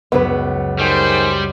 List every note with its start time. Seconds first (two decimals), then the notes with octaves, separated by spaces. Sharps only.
0.12 C#2 F#2 B3 B4
0.79 D#3 G3 G#4 C5